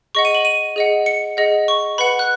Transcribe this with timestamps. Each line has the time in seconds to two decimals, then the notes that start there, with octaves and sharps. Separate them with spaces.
0.15 G#4 D#5 F#5 C#6
0.25 D#7
0.35 F#7
0.45 D#7
0.76 G#4 D#5 F#5
1.06 C#7
1.37 G#4 D#5 F#5
1.68 C#6
1.98 B4 F#5 B5
2.19 F#6